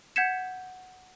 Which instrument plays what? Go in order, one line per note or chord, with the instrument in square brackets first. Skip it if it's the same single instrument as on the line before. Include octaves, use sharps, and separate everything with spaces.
[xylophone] F#5 G6 G#6 B6 C#7 E7